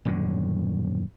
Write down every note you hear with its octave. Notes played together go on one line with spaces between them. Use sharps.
D#1 F#2 A2 D3